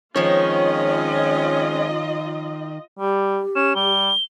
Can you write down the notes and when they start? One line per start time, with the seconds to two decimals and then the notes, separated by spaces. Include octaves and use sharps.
0.16 D#3 F3 G#3 C4 C#4 F4 C#5 D#5
2.99 G3 G4
3.56 C#4 E7
3.76 G3 G7